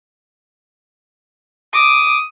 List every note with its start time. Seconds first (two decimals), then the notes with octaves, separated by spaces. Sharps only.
1.74 D6 D#6